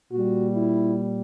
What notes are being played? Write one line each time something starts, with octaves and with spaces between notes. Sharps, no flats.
A#2 G3 F#4
E4